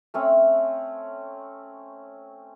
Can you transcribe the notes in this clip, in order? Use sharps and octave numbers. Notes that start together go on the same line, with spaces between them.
A3 C4 C#4